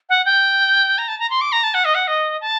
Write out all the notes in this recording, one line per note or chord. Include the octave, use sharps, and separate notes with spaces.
F#5
G5
A#5
A5
A#5
C6
D6
A#5
A5
F#5
D#5
F#5
D#5
A5